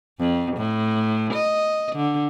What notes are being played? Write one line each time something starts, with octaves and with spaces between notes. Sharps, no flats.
F2
A2
D#5
D3